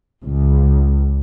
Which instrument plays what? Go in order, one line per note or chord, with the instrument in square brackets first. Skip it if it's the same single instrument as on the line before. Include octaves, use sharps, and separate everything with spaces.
[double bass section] C#2